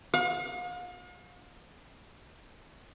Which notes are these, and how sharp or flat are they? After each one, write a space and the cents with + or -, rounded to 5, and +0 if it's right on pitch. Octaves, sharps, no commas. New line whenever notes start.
F5 +45